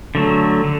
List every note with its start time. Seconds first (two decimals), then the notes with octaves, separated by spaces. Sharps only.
0.15 D3 F#3 A3
0.64 D3